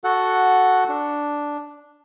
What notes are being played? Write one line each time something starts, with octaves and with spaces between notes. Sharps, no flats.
F#4 A4 F#5
D4